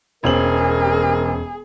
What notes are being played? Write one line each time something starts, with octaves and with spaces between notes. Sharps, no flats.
E1 E2 C4 C#4 G#4 A#4 G#6 F#7